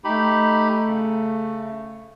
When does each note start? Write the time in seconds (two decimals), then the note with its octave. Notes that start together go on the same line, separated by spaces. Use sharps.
0.04 A3 D#4 G4 B5
0.87 C#3